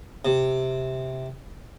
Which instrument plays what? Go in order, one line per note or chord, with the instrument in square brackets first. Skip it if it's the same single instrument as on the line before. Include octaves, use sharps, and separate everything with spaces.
[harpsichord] C3